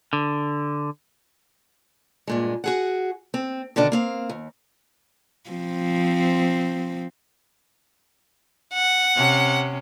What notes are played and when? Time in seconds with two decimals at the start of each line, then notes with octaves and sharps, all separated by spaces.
0.13 D3
2.28 G2 A#2 G#3
2.64 F#4 G#4 F#5
3.34 C4
3.76 B2 D3 D#3 D4
3.92 A#3 C4 F5
4.30 D#2
5.50 F3 C4
8.74 F#5
9.15 C3 C#4